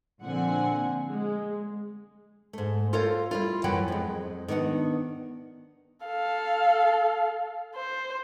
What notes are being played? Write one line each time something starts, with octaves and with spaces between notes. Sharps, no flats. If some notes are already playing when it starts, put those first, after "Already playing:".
A#2 D3 F3 C4 F#5 G#5
G#3
G#2 A3
F4 A4 A#4 C5 C#5 F5
G3 E4 F4
F#2 E3 F#3 E4 F#5 G5
F2 G#3
D#3 B3 D4 C5 F#5
A4 F5
C5